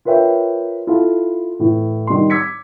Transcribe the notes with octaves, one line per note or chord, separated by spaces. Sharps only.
F4 A#4 B4 C#5 E5 G5
E4 F4 A4 F5
A2 E3
D#3 G3 C6
D6 E6 G#6 B6 C#7